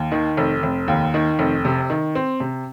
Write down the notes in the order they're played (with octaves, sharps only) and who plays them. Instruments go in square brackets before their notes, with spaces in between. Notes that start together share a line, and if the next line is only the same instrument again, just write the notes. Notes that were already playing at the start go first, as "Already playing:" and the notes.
Already playing: [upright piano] D#2
D#3
F1
F1
D#2
D#3
F1
C3
D#3
C4
C3